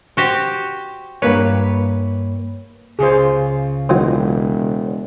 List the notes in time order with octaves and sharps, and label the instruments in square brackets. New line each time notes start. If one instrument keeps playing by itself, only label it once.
[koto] F#4 G4 C5
[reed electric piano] G2 A#3 C#5 [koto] B4
[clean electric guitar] C#2 C#3 F4 [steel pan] G#4 C5
[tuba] E1 [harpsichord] D#3 F3 F#3